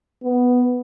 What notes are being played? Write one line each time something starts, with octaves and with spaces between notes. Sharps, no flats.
B3